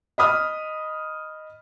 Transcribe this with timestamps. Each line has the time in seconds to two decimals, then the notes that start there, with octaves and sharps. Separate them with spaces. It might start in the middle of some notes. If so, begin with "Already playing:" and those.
0.18 D#5 B5 D#6 F6